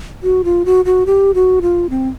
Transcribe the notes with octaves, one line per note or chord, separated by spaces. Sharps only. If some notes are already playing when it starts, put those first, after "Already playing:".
F#4
F4
F#4
F#4
G4
F#4
F4
C4